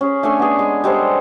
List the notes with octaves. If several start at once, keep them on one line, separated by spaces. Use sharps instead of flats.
C#4 G#4
A3 D4 A4 G#5
B3 G#4
G#3
G3 G#3 A4 C5